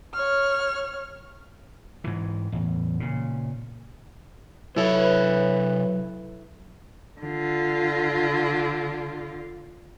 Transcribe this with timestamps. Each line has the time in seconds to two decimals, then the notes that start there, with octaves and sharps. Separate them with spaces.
0.14 C#5 F6
2.04 G#2 E3
2.52 A1 E2
3.00 A#2 C#3
4.76 C3 F#3 E4 A4 B4 C#5
7.21 D3 F4